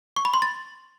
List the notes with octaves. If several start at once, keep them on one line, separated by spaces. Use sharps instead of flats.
C#6
B5
C6
A6